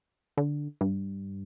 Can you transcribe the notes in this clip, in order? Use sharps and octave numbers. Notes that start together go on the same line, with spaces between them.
D3
G2